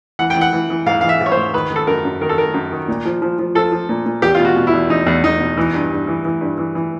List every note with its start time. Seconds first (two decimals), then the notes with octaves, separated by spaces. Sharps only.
0.19 E3 F#5
0.30 G5
0.36 E3
0.41 F#5
0.53 E3
0.70 E3
0.86 G#2 F5
1.01 E3 F5
1.09 E5
1.20 G#2
1.26 C#5
1.31 C5
1.37 G#2
1.54 D#3 B4
1.71 D#3
1.76 A4
1.87 F#2 A#4
2.04 F#2
2.21 D#3 A#4
2.29 A4
2.37 D#3 A#4
2.54 F#2
2.72 D#3
2.88 A#2
3.05 F3
3.22 F3
3.39 F3
3.55 F3 A4
3.72 F3
3.89 A#2
4.06 A#2
4.22 E2 G4
4.34 B2 F4
4.45 F#4
4.56 B2
4.67 E4
4.73 E2
4.90 E2 D#4
5.06 E2
5.24 E2 D#4
5.40 B2
5.57 E3
5.74 G2
5.91 G2
6.07 E3
6.25 E3
6.41 G2
6.58 E3
6.75 E3